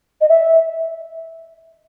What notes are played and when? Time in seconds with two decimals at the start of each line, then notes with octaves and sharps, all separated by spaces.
0.20 D#5
0.29 E5